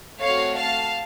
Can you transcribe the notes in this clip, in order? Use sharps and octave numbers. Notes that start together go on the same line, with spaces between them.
A3 C4 F#4 C#5 F5
F5 A5